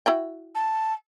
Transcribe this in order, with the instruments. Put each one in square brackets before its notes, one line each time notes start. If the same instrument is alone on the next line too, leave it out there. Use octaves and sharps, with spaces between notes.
[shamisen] E4 F#4 G5
[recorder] A5